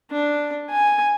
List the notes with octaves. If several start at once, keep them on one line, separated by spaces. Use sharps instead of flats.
D4
G#5